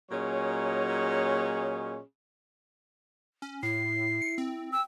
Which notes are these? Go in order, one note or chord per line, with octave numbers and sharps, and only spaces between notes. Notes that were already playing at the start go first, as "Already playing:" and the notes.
A#2 F#3 C#4 G#4 C#5 D#5
C#4
A2 E4 C7
C#7
C4
G5 E6